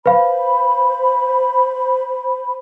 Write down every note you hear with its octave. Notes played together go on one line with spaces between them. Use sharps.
B4 C5 F5 B5